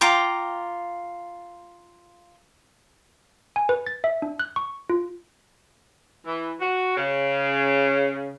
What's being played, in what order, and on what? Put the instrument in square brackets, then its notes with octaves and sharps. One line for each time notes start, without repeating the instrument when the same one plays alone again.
[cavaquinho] F4 G5 A#5 D6
[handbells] G#5
B4
A6
E5
D4
F#6
C#6
F4
[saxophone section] E3
F#4
C#3